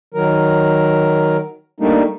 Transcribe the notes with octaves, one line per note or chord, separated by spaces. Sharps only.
D#3 F#3 A#4
G3 A3 A#3 D4 D#4